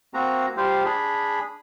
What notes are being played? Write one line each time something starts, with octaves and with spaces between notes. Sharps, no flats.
A#3 C4 F#4 A#5
G3 F4 G4 C5 F5
D4 G#4 B5